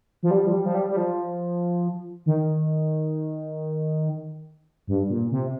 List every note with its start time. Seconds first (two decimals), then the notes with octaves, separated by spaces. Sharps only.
0.23 F3
0.31 G3
0.47 F3
0.52 G3
0.66 F3
0.75 G3
0.90 G3
0.97 F3
2.26 D#3
4.87 G2
5.10 A#2
5.31 C3